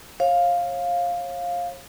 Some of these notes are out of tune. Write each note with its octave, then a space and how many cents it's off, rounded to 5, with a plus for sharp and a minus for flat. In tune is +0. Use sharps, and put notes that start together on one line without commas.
C#5 -35 F5 +5